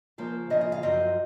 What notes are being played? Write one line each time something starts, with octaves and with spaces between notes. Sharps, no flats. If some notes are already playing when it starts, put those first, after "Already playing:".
C#3 F3 A#3 C5
C#3 F3 A#3 D#5
D#5
F5
F#2 F3 C4 F4 D#5